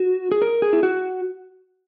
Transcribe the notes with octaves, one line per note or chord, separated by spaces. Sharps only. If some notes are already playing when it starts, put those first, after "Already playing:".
Already playing: F#4
G#4
A#4
G#4
E4
F#4